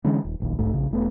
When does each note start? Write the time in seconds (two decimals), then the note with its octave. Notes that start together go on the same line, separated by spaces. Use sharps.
0.04 D3 E3 G#3 C#4
0.25 D#1
0.40 D1 A#1 D#2
0.59 D1 B1 G#2 A3
0.74 A#1 C#3
0.91 E1 A3 B3